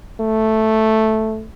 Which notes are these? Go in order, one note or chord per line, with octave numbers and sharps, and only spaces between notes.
A3